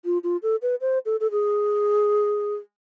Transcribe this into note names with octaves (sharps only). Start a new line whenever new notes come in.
F4
F4
A4
B4
C5
A4
A4
G#4